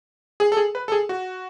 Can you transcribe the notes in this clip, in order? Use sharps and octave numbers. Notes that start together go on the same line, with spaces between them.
G#4
A4
G#4
B4
A4
G#4
F#4